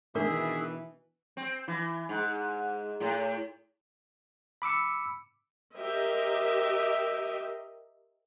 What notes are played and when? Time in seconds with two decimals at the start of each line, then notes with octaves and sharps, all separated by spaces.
0.15 B2 D#3 E3 D4 G#4 A#4 E5 D6
1.37 C4
1.68 E3
2.09 G#2
3.00 A2
4.62 B5 D6 E6 C#7
5.74 G4 A#4 C5 D#5 E5